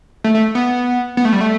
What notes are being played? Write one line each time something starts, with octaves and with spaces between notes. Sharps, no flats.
A3
A3
B3
B3
A3
G3
A3